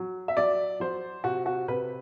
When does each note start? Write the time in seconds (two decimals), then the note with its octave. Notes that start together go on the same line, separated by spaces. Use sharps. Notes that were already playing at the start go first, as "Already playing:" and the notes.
Already playing: F#3
0.28 E5
0.37 F#3 D5
0.80 F#3 C5
1.24 C3 F#4
1.46 F#4
1.68 C3 B4